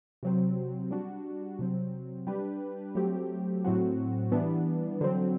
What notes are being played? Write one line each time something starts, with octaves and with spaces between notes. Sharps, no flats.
C3 F#3 C4
G3 D4 F#4
C3 F#3 C4
G3 D4 G4 B4
F#3 A3 C4 G4
A2 F#3 C4 F#4
E3 G3 B3 D4
D3 F#3 C4